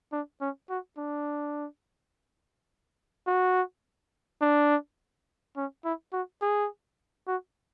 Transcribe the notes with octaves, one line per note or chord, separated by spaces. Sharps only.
D4
C#4
F#4
D4
F#4
D4
C#4
E4
F#4
G#4
F#4